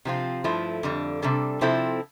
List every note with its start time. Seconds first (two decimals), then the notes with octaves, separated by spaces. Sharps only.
0.05 C3 F3 C4 F4
0.44 G2 F3 A3 E4
0.83 F2 D3 G3
1.22 C3 G3 D4 A4
1.61 C3 F3 C4 E4 A4